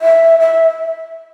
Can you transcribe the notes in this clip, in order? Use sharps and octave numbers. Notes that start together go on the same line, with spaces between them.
E5
E5